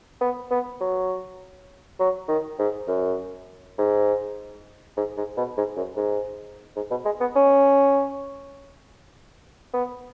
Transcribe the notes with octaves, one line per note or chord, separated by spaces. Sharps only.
B3
B3
F#3
F#3
D#3
G#2
F#2
G#2
G#2
G#2
B2
G#2
F#2
G#2
G#2
B2
G#3
B3
C#4
B3